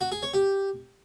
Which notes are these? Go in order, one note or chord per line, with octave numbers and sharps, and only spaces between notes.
F#4
G#4
C#5
G4